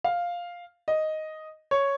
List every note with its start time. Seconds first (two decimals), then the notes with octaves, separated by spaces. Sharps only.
0.04 F5
0.88 D#5
1.71 C#5